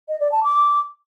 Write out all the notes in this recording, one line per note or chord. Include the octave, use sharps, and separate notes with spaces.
D#5
D5
A5
D6